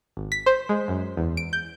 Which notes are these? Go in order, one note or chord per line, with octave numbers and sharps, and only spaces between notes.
G#1
B6
C5
G#3
F#2
E2
D7
G6